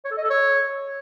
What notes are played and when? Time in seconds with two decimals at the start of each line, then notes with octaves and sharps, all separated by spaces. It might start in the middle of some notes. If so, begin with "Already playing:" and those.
0.05 C#5
0.11 A4
0.17 D#5
0.24 A4
0.30 C#5